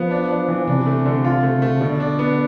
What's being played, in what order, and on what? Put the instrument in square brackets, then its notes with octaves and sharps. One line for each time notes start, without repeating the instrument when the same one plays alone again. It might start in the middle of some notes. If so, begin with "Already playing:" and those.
Already playing: [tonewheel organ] F3 [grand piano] B3
[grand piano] D4
D4
E3
[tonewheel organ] C3 [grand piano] D4
[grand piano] A3
D3
F4
A3
A3
[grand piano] B2 [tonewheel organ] D3
[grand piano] D4
B3